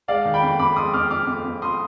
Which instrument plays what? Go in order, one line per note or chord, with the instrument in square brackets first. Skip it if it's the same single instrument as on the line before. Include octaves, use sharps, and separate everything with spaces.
[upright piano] G#3 D5 F5
D#3
G5 B5
F2
F2 B5 D6
G#3 C6 D#6
F2 D6 F6
F2 D6 F6
F2
F2
C6 D#6